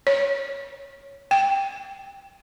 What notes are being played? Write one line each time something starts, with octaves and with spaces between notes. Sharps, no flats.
C#5
G5